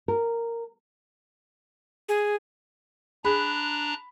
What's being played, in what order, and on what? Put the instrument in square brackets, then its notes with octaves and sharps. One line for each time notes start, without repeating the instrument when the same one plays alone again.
[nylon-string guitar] A#4
[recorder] G#4
[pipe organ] D4 A#5 F#6 [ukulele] G#4 [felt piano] B5